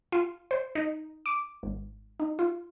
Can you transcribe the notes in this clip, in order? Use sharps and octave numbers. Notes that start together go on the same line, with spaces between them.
F4
C5
D#4
D6
G#1
D#4
F4